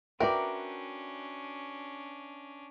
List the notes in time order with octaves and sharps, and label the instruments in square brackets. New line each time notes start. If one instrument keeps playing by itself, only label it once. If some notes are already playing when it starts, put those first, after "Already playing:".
[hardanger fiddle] C#4 D4 [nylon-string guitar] F#4 D5 [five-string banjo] A#4 [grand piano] B4 E5 G5